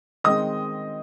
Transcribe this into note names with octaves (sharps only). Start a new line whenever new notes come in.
D#3 G#3 C4 D#5 D#6